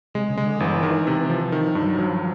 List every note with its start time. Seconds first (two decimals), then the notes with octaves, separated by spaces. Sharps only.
0.14 C3 G#3
0.30 C#3
0.37 G#3
0.45 D3
0.60 G1 E3
0.83 D#3
1.07 C3
1.30 F3
1.52 D#3 E3
1.67 F3
1.75 G2
1.83 F#3
1.98 F3 F#3